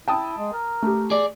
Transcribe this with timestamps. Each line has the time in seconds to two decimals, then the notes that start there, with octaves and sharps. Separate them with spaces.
0.08 E4 G5 A5 D#6
0.38 G#3
0.53 A#4
0.82 A3 G4
1.10 G#4 D5